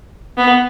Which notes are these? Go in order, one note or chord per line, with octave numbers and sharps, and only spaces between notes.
B3